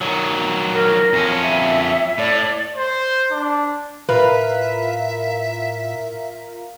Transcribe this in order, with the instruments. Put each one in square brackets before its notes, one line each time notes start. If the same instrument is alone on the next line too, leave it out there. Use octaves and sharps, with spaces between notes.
[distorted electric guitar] D#3 F#3
[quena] A#4
[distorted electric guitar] F2 C#4
[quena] E5
[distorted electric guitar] A2 [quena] D5
[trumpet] C5
D4
[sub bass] A2 [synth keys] F4 A#4 F5 [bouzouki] B4 [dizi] E5